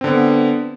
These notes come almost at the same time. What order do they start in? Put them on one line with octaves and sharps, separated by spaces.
C4 D3 B3